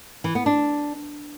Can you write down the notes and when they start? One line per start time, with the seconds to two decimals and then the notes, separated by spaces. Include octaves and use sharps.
0.24 E3
0.35 B3
0.46 D4